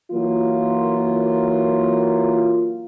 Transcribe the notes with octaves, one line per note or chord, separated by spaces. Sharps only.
E3 F#3 A#3 F4